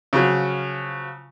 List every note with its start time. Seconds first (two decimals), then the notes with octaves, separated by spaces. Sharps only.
0.13 C#3 F3 F#3